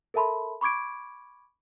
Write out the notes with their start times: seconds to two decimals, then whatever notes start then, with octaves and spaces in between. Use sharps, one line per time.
0.14 A4 A#4 E5 A5 B5 C6
0.61 B5 C#6 D6 G#6 D7